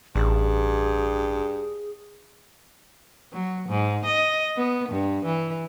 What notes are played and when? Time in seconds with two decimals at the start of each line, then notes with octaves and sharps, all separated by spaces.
0.15 A1 G2 G#4
3.33 F#3
3.69 G#2
4.05 D#5
4.57 B3
4.89 G2
5.26 E3